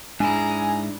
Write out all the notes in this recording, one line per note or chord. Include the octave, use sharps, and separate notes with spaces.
G#2 D4 E4 G#4 G#5 A#5